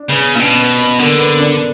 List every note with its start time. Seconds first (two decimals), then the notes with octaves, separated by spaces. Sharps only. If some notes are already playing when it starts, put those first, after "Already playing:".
Already playing: D4
0.09 C#3 B3
0.35 A#2 D4
0.40 B2 C#4
0.60 B3
0.79 B3
0.99 D3 A#3
1.18 B3
1.39 D4